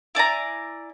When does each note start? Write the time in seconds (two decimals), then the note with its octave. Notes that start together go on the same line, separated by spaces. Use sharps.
0.15 E4 D5 G#5 A#5